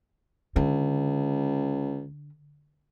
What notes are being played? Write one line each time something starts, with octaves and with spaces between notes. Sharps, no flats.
C#2 D3